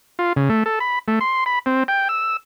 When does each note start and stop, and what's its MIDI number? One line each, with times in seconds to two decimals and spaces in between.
0.19 0.33 65
0.37 0.49 49
0.49 0.63 57
0.66 0.79 69
0.80 0.99 83
1.08 1.19 57
1.21 1.44 84
1.46 1.59 83
1.66 1.83 60
1.88 2.08 79
2.09 2.37 88